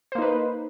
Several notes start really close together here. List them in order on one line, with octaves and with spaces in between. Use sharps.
C5 A#3 D#4 B4